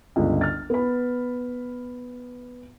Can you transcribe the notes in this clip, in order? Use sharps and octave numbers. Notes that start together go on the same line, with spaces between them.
G1 C#2
F6 A6
B3 B5